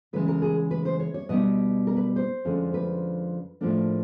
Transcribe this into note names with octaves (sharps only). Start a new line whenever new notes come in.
C#3 E3 G#3 B4
A#4
G#4
B4
C5
C#5
C#5
B2 G3 B3 D#4 D#5
A#4
B4
C5
F2 D3 F3 G#3 C#4
B4
A2 F3 A#3 D4